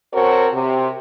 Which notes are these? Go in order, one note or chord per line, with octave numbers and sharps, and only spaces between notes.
C4 F#4 A4 A#4 C5 C#5
C3